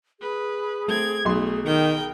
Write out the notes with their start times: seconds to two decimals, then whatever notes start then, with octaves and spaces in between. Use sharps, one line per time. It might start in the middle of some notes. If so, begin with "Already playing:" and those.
0.20 G#4 B4
0.88 A3 C4 G#6
1.25 B1 A3 C6
1.66 D#3 A#4 G5